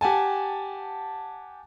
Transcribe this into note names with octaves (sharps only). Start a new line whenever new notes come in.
G4 F#5 G#5 A5